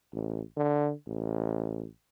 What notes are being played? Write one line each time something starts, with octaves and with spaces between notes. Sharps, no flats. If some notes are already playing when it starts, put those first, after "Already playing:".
A1
D3
A1